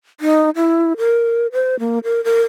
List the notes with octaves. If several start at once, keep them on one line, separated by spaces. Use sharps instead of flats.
D#4
E4
A#4
C5
A#3
A#4
A#4